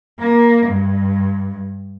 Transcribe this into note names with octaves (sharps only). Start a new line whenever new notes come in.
A#3
G2